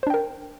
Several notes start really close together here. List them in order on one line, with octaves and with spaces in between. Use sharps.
C5 D4 G5 A#4